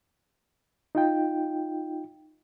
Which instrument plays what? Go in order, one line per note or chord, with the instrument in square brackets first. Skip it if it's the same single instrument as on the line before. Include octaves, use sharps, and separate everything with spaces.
[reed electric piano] D#4 F4 G5